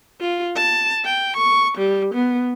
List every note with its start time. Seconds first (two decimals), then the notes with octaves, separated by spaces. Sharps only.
0.20 F4
0.56 A5
1.05 G5
1.36 C#6
1.78 G3
2.14 B3